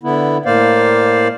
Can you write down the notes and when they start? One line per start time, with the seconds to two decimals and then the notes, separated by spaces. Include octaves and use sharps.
0.03 D3 B3 E4
0.45 A2 A#3 C5 D5 F5